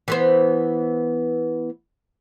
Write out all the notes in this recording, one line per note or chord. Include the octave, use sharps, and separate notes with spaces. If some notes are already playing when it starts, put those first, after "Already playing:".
E3 B3 C5